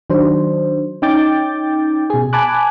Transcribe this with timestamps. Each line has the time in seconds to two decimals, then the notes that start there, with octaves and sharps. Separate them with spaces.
0.10 D#3 F#3 D4 C5
1.02 C#4 D#4 G5 D6 G6 A6
2.10 B2 G#4
2.33 G#5 A5 B5 D6 F#6